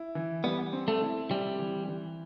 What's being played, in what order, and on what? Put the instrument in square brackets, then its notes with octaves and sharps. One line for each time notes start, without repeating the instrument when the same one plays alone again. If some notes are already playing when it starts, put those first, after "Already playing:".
Already playing: [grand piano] E4
E3
[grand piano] G3 [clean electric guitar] B3
[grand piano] C4
[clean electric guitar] A3
[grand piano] E4
[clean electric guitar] G3 [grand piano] C4
[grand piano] E3
E3